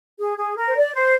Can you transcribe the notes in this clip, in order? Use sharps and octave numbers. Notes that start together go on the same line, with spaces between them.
G#4
G#4
A#4
C5
D5
C5